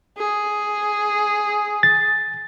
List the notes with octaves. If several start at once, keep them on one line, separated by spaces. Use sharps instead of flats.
G#4
A6